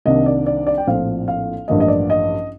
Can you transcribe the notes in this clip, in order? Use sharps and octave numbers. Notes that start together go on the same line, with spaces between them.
C2 C3 D#3 A#3 D4 D#5
D5
D5
D5
G5
A#1 A2 F3 C4 F5
F5
A1 G2 F3 A#3 D4 D#5
D#5
D5
D#5